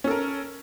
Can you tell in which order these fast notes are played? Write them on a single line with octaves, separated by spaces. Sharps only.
C#4 A4 A#4